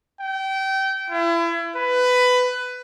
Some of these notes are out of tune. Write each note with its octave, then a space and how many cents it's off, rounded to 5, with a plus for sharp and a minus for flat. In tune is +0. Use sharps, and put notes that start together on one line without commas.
G5 -25
E4 +35
B4 +15